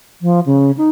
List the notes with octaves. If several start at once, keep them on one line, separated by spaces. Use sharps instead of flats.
F3
C#3
D#4